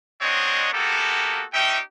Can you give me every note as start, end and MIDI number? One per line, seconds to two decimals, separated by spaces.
0.22 0.69 56
0.22 0.69 60
0.22 0.69 62
0.22 0.69 73
0.22 0.69 75
0.22 0.69 78
0.73 1.43 58
0.73 1.43 59
0.73 1.43 66
0.73 1.43 67
0.73 1.43 69
1.54 1.80 61
1.54 1.80 63
1.54 1.80 67
1.54 1.80 76
1.54 1.80 79